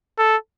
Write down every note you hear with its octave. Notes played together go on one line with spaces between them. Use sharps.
A4